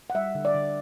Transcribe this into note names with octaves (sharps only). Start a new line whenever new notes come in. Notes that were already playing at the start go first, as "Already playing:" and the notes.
F#5
G3 E5
D3
D5
D3